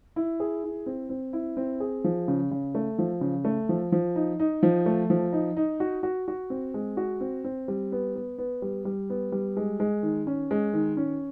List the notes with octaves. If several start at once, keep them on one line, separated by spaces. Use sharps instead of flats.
E4
G#4
E4
C4
C4
E4
C4
G#4
F3
C#3
C#3
A3
F3
C#3
A3
F3
F3
D#4
D#4
F3
A3
F3
D#4
D#4
F#4
F#4
F#4
C4
G#3
F#4
C4
C4
G3
B3
B3
B3
G3
G3
B3
G3
G#3
G#3
D#3
C#4
G#3
D#3
C#4